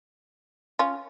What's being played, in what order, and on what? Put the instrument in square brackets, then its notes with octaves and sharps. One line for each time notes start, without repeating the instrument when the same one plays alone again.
[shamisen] C#4 F4